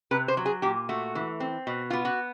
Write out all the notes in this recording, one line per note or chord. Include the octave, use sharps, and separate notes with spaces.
C3 B4
C5
F#3
G#4
A#2 G4
A3 F#4
E3
C4
B2
B3 F4
F#4